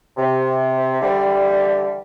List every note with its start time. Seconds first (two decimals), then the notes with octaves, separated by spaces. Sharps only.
0.17 C3
1.00 D3 E3 G3